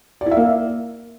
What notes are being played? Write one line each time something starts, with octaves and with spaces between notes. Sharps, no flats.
D5
E4
E5
A#3